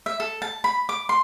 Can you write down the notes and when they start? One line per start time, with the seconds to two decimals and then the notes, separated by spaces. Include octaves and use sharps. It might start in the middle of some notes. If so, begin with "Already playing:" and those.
0.06 E5
0.20 A4
0.42 A5
0.64 B5
0.89 D6
1.09 C6